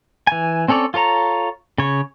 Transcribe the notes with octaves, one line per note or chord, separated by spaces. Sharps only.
E3 G#5
C4 C#4 A4 C#5 D5
F4 A4 C#5 A#5
C#3 C#5